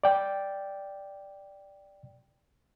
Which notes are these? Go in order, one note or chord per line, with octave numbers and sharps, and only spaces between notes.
D5 G5